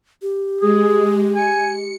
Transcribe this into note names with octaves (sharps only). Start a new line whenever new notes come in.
G4
G#3 G#4
G#5 C#7